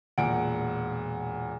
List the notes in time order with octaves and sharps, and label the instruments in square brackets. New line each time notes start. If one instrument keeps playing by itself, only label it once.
[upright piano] E1 A#2 F#5 D7